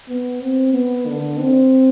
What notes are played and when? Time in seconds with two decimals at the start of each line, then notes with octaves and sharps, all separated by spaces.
0.08 B3
0.41 C4
0.73 B3
1.06 D3
1.39 C4